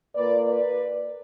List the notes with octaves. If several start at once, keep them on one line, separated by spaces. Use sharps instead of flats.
A#2 A#3 B4 D5
B4 D5